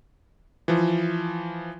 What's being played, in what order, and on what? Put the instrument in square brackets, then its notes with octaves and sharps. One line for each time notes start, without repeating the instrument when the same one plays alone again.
[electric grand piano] E3 F3